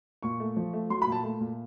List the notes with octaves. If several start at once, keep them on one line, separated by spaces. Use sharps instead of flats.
A#2 C#6
A3
F3
A3
F#3 C6
B5
A#2 A5
A3
A#2